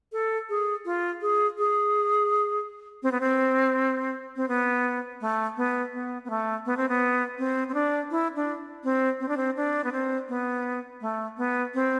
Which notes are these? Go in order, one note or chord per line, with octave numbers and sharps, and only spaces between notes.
A4
G#4
F4
G#4
G#4
C4
B3
C4
C4
B3
A3
B3
B3
B3
A3
B3
C4
B3
C4
C4
D4
E4
D4
C4
C4
D4
C4
D4
B3
C4
B3
A3
B3
C4